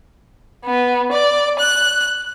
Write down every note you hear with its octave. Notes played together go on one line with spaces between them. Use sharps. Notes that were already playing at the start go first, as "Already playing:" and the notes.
B3
D5
F#6